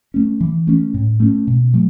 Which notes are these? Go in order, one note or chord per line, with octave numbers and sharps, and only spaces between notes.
A3 C#4
E3
A3 C#4
A2
A3 C#4
B2
F#3 A3